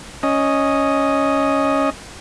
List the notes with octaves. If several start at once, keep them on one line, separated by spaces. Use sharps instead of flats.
C#4 D#5